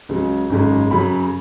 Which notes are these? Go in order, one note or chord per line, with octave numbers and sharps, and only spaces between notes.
C#2 C#3 F#3
G#1 F#2 C#3 G#3
F#2 C#3 F#3 B5